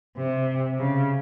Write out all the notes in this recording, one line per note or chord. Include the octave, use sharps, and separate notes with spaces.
C3
C#3